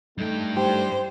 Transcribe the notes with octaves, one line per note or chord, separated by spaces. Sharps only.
G2 A3 D#4 G5
G4 C5